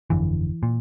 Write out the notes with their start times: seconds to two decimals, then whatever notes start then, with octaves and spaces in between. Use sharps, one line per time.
0.10 G1 F2 D3 E3
0.63 A#2